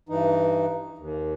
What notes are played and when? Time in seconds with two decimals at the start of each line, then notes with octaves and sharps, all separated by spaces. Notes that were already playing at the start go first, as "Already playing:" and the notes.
0.09 G2 E3 D#4
0.98 D#2